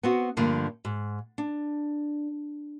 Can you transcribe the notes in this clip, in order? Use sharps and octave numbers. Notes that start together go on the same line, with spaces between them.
B3 C4 F#4
G2 D3 F3 A3 A#3
G#2
D4